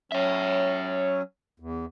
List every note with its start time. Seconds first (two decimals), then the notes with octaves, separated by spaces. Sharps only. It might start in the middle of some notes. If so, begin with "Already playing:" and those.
0.12 F#3 C#4 C#5 E5
1.60 E2